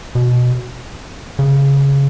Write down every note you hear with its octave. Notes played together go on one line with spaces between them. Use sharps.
B2
C#3